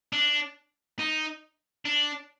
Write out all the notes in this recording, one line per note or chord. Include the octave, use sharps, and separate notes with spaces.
D4
D#4
D4